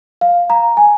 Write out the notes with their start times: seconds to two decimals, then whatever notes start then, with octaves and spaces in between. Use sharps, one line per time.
0.21 F5
0.50 A#5
0.77 G#5